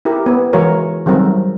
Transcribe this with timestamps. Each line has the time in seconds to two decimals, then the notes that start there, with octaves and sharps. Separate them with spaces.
0.05 E4 G4 A#4
0.26 B3
0.53 E3 G#3 F#4 A#4 C#5
1.06 D#3 F#3 G3 C4 A#4